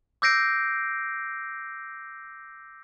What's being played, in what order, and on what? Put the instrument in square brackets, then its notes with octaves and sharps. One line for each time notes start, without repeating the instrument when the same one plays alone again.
[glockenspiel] D6 E6 G6 A#6 C7 D7